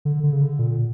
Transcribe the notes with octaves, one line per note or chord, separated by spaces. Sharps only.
D3
D3
C#3
D3
A#2